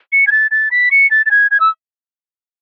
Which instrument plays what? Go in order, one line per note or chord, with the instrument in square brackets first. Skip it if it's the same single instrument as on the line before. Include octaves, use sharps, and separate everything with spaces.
[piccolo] C#7
G#6
A6
A6
B6
C#7
A6
A6
G#6
G#6
E6